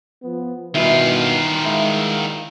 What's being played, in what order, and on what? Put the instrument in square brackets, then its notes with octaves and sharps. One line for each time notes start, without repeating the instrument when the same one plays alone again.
[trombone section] F3 B3
[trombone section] G2 B2 [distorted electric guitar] D#3 F4 [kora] E3 E4
[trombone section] G#3 [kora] E4